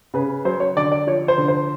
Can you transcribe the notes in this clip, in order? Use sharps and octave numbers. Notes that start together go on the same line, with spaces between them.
C#3 B4
F#3 C5
C#5
D3 D5
D5
F3 C#5
C5
D3
C5